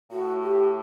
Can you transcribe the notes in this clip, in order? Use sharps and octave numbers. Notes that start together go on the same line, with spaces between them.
A2 F#4
G4